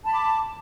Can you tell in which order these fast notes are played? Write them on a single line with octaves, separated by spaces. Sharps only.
A5 B5 D6